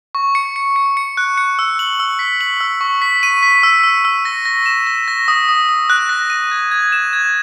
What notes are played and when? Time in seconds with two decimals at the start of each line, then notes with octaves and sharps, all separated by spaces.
0.15 C#6
0.35 C#7
0.56 C#7
0.76 C#7
0.97 C#7
1.17 F#6
1.37 C#7
1.59 E6
1.79 F#7
2.00 E6
2.19 B6
2.41 F#7
2.60 E6
2.81 C#6
3.02 B6
3.23 D#7
3.43 B6
3.63 E6
3.83 E6
4.05 E6
4.25 A#6
4.45 A#6
4.66 E7
4.87 A#6
5.08 A#6
5.28 D#6
5.49 D#6
5.69 D#6
5.90 F#6
6.09 A#6
6.30 D#7
6.51 G#6
6.71 G#6
6.92 E7
7.13 G#6